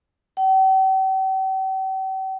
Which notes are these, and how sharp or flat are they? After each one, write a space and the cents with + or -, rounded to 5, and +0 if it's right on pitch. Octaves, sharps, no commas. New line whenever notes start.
G5 -45